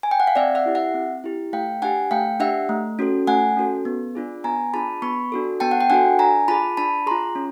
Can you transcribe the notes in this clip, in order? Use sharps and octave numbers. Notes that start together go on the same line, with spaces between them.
G#5
G5
F#5
F5
C4 D5 E5
E5 F#5
E4 G4
E5 F#5
C4
E4 G4
A3 F5 G5
D4 G4 F#5 G#5
A3 F5 G5
D4 G4 E5 F#5
A3
C#4 F#4 A4
A3 F#5 G#5
C#4 F#4 A4
B3
D4 F4 G#4
B3 G#5 A#5
D4 F4 G#4 A5 B5
B3 B5 C#6
D4 F#4 A4
B3 G5 A5
F#5
G5
D4 F#4 A4 F#5 G#5
D4 G#5 A#5
F4 G#4 A5 B5
D4 A5 B5
F4 G#4 A#5 C6
C#4